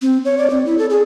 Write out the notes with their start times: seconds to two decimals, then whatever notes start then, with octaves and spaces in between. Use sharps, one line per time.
0.02 C4
0.25 C#5
0.38 D5
0.50 C4
0.66 E4
0.78 A4
0.90 G#4